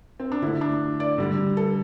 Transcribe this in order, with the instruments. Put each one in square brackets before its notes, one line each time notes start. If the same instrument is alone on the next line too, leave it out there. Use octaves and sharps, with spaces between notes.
[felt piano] C4
D4
D3 E4
A3
D4
D5
D3 G3
A4